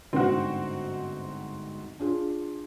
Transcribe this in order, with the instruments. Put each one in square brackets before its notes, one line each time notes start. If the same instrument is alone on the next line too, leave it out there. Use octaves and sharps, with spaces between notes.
[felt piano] G1 G#2 [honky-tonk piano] C4 F#4
[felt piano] D4 F4 G#4